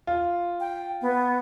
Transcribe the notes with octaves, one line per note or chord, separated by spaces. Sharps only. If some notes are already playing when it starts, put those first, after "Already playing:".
F4
G5
B3